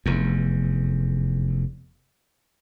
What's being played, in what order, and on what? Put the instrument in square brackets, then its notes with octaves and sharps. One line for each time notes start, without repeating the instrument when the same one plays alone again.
[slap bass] F1 E2